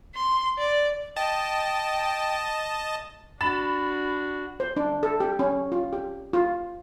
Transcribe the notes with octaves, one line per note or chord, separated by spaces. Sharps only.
C6
D5
D#5 G5 A5
D4 F#4 B5 A6 E7
C5
D4
A4
G4
C#4
F4
G4
F4